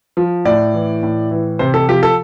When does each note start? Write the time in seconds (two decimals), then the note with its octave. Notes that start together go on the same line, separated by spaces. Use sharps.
0.17 F3
0.45 A2 D5
0.74 E3
1.03 A2
1.31 E3
1.59 C3 C5
1.74 A4
1.88 F3 G4
2.03 A4